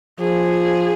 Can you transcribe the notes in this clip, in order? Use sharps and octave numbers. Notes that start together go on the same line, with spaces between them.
F3 G#4